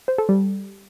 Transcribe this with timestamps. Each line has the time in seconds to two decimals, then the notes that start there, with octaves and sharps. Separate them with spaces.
0.08 C5
0.18 A4
0.29 G3